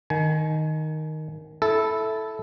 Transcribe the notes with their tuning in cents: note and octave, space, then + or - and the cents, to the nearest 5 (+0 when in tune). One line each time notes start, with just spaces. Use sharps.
D#3 +0 G#5 +35
E4 +0 A4 -10